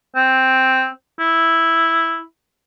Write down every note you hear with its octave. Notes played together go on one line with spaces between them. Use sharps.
C4
E4